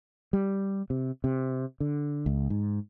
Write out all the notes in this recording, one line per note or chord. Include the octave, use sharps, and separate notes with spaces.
G3
C3
C3
D3
C#2
G#2